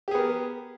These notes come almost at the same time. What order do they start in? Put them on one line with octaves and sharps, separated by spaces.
G4 G#4 B3 A#4